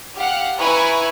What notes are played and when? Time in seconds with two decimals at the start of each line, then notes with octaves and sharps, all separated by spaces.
0.15 G4 F5 F#5
0.58 E4 B4 G#5 A#5 B5 C#6